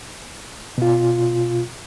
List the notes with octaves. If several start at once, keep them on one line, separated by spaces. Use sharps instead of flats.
B2 F4